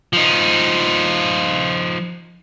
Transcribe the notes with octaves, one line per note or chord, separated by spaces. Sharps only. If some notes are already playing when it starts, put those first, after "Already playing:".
F3 D#4